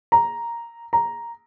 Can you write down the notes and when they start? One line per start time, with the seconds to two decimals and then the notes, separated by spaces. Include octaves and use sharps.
0.12 A#5
0.93 A#5